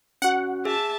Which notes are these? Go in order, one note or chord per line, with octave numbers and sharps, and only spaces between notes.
C#4 F#4 F#5
G#4 E5 A5